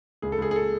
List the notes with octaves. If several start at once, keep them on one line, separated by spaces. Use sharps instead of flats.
C#2 G#4
A4
C#2 G#4
G#4
A4